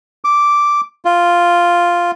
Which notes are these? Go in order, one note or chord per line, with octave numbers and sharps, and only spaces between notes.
D6
F4